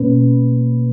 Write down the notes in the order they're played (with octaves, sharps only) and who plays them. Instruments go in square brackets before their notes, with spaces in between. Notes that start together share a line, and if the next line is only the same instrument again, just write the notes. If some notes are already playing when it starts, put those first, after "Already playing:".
Already playing: [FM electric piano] B2 A#3 C#4 B4